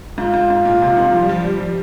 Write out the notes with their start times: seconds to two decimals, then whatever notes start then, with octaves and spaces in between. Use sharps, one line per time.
0.18 G#2 F4
0.34 G#2
0.50 G#2
0.65 A#2
0.82 C3
0.97 D#3
1.13 F3
1.22 G3
1.29 F3
1.44 G3
1.60 F3